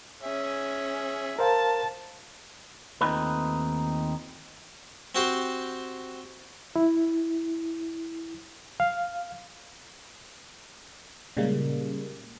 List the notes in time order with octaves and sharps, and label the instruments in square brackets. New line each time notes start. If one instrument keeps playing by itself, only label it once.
[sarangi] C#4 [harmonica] G#4 E5
[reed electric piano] A#4 C5 F5 [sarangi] A5
[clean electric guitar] D#2 A3 C4 D#4 F4 B4
[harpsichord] C4 F#4 G4 C5
[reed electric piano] E4
F5
[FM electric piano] A#2 C#3 G3 G#3 A#3